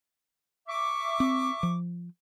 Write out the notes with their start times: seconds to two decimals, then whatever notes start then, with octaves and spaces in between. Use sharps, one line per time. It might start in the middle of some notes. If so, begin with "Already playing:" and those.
0.68 E5 C#6 D6
1.20 C4
1.63 F3